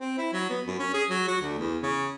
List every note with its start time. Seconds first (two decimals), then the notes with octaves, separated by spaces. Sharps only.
0.01 C4
0.18 E4
0.33 F#3
0.50 B3
0.67 F#2
0.79 C#4
0.94 G#4
1.10 F#3
1.28 F#4
1.42 D2
1.59 E2
1.83 C#3